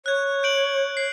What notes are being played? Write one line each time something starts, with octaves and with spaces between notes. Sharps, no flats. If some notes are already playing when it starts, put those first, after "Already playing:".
C#5 F#6 G#6
G6 D7 F#7
C7